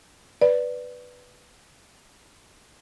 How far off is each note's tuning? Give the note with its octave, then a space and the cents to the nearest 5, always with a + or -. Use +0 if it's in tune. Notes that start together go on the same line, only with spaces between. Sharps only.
B4 +0 D5 +0